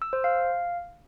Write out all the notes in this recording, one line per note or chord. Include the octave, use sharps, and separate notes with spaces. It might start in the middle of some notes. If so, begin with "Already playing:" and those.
E6
C5
F5